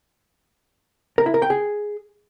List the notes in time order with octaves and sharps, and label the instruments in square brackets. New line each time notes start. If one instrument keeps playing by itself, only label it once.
[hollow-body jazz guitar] A#4
E4
A#4
G5
G#4